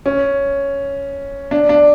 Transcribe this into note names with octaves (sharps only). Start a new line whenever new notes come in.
C#4
D4
D4